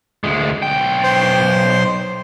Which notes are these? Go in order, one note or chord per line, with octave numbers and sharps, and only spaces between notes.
D2 G#3
B1 G5
C5 C6